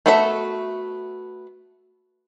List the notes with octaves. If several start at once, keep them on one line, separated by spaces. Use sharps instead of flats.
A3 B3 F#4 A4 E5